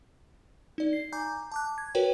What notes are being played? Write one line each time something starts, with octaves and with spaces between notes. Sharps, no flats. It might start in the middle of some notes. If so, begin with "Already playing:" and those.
D#4 D5
C7
G#5 A#5 D6 G6
A5 D6 F#6
G#6
F#4 A#4 B4 C#5 G5